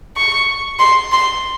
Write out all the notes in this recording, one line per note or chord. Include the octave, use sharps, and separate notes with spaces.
C#6
C6
C6